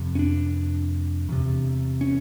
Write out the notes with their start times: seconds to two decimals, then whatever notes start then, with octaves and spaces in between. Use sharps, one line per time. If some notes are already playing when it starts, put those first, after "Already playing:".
Already playing: F2 C3
0.15 C#4
0.19 D4
1.29 E2 C3
2.01 C#4